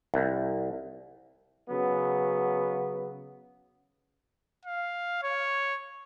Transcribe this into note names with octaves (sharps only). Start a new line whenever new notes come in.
C2
C#3 F#3 B3
F5
C#5